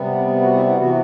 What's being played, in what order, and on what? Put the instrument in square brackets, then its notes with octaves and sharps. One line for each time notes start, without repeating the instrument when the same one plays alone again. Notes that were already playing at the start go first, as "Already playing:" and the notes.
Already playing: [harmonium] C3 G3 B3
F#4
E4
E4
C3 E3 B3 F#4